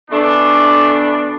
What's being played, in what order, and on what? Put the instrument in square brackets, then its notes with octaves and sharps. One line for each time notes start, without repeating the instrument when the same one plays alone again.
[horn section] B2 E3 A3 D4